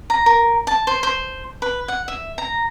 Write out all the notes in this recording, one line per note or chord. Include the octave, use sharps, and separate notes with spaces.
A#5
A#4
A5
C5
C5
B4
F#5
E5
A#5